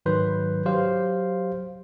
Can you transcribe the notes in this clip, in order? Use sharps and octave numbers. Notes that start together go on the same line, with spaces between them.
G#2 D#3 F#3 B4 C6 G6
F#3 G4 C5 F5